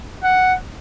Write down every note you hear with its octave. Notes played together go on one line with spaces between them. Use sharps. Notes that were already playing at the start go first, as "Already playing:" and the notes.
F#5